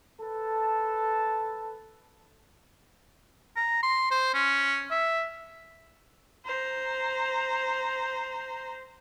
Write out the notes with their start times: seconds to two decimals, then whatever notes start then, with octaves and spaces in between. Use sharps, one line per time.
0.21 A4 B4 A5
3.57 A#5
3.83 C6
4.11 C5
4.34 C#4
4.91 E5
6.45 C5 A#5